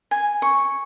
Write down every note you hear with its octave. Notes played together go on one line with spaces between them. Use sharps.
G#5
C#6